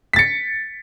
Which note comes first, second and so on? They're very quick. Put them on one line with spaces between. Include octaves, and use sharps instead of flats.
B6 A6 C#7